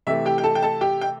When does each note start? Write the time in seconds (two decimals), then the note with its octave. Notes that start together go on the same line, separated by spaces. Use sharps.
0.07 C3 E3 A3 E5
0.26 G4 G5
0.38 G5
0.44 A4 A5
0.55 G5
0.62 A4 A5
0.81 G4 G5
1.01 G5